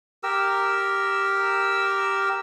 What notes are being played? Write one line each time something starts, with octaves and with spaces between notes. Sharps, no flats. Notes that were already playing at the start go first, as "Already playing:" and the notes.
G4 A#4 E6